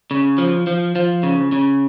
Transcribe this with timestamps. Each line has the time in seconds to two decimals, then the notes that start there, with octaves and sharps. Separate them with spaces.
0.11 C#3
0.38 F3
0.67 F3
0.96 F3
1.23 C#3
1.52 C#3